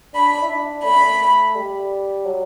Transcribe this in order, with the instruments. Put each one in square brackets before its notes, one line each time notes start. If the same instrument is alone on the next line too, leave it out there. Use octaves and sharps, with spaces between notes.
[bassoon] D4 [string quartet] B5
[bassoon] E4
D4
[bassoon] A3 [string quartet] B5
[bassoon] G3
F#3